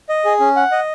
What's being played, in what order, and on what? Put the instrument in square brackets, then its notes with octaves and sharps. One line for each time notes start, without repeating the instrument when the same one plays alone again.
[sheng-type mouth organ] D#5
G#4
C#4
F#5
D#5